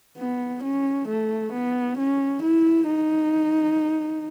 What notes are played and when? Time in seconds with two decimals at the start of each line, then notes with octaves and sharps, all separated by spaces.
0.18 B3
0.63 C#4
1.08 A3
1.52 B3
1.98 C#4
2.43 E4
2.87 D#4